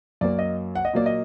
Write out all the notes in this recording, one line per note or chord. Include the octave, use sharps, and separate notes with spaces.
F#2 F#3 A#3 D5
D#5
F#5
D#5
A#2 F#3 A#3 D5
D#5